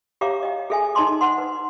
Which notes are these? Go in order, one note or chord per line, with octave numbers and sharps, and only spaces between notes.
G4 C#5 E5 F5 A#5 D6
D#5 G5
G#4 A4 E5 G5 G#5
D#4 D#5 A5 A#5 C6 D6
C5 F#5 C6
B4